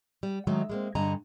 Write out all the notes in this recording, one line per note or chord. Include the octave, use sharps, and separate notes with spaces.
G3
D#3 F#3 G#3 A3 D#4
G#3 A#3 C4
G2 D3 D#5 G#5 A#5